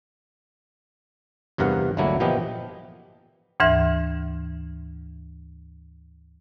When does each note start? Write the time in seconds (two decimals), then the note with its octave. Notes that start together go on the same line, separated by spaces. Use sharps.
1.58 E2 G2 C3 A#4 F5 F#5
1.97 G1 D2 D3 F#3 A#3 E4
2.20 A#2 E3 F3 B3 G4 D#5
3.60 D2 G#2 E3 E5